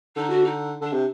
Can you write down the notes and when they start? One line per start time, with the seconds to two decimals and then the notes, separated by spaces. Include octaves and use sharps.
0.16 D3 D#4
0.29 F#4
0.44 D#4
0.81 D3 D4
0.93 C3